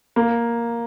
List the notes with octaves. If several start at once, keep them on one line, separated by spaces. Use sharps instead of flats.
A#3